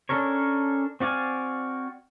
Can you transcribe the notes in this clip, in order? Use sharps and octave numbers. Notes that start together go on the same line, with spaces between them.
C#4 D4 A4 A#4 C#5
C4 F#4 D5 F5 G#5